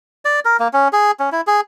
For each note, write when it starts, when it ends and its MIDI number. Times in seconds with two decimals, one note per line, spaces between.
0.25 0.40 74
0.45 0.57 70
0.60 0.68 58
0.73 0.88 61
0.93 1.11 68
1.19 1.30 61
1.32 1.41 64
1.47 1.61 68